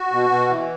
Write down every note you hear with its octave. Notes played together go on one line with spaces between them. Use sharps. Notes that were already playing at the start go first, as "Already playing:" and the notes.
Already playing: F#4
B2
B2
E3